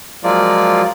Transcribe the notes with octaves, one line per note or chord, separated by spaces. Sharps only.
F3 F#3 G#3 A#3 F4 D5